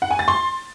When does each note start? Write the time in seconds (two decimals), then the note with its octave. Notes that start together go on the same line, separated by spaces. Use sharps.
0.02 F#5
0.11 G#5
0.19 A6
0.28 C6